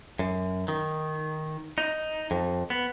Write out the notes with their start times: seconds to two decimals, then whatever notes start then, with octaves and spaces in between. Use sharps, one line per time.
0.19 F#2
0.68 D#3
1.78 D#4
2.31 F2
2.70 B3